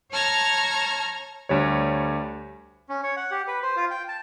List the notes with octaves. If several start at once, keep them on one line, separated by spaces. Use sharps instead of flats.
C#5 A5 A#5 F6 G#6
D2 G3 C#5
C#4
C#5
F#5
G4
B4
C5
F4
G5
A5